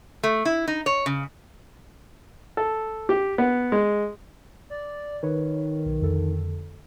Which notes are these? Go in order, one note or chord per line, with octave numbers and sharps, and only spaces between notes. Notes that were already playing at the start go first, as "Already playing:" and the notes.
A3
E4
D#4
C#5
C#3
A4
G4
B3
G#3
D5
D#3 D#4 B4 C#5
B1
F2 D3 A4